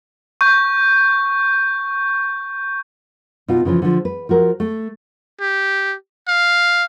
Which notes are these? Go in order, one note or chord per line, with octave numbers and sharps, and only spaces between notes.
C#6 G6
B2 B3 D#4 F4
C#3 E3 F3 C#4
D3 F3
B4
F3 F#4 A#4
A3
G4
F5